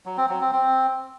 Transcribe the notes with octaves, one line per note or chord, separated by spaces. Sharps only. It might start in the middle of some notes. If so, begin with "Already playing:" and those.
F#3
C4
F#3
C4
C4